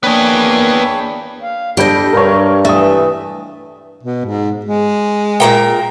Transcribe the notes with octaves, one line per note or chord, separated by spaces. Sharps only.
A#3 B3 D4 G#4 C#5 G5
F5
G2 G3 D4 G4 A4 D#5 G6
G2 A#4 C#5
E3 A3 E5 D#6
B2
G#2
G#3
A#2 A#4 G5